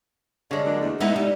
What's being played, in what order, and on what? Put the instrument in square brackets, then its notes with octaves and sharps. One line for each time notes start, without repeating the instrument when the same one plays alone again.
[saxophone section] G2 C#5 F5 [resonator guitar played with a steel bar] D3 G#3
[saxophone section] F#3 A#3 D4
E2 A3
[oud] G#3 A3 D#4 [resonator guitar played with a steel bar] B3 [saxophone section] E4 E5
[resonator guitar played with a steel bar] G3 [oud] D#4